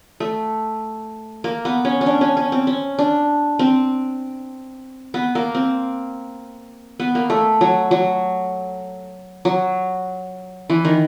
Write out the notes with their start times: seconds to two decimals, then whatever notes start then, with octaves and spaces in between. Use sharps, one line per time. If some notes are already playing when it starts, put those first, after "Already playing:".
0.20 A3
1.44 A#3
1.65 B3
1.85 C#4
2.01 C#4
2.06 D4
2.21 C#4
2.37 C#4
2.52 C4
2.67 C#4
2.99 D4
3.59 C4
5.14 B3
5.35 A#3
5.55 C4
7.00 B3
7.15 A#3
7.30 A3
7.61 F#3
7.91 F#3
9.45 F#3
10.70 E3
10.85 D#3